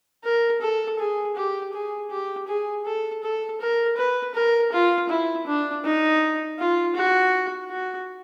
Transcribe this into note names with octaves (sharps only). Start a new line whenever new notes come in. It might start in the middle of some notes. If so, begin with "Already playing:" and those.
A#4
A4
G#4
G4
G#4
G4
G#4
A4
A4
A#4
B4
A#4
F4
E4
D4
D#4
F4
F#4
F#4